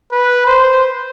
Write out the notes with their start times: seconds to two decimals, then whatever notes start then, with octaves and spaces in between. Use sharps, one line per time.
0.12 B4
0.46 C5